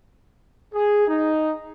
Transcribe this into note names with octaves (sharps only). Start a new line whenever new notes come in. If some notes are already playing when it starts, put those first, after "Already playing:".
G#4
D#4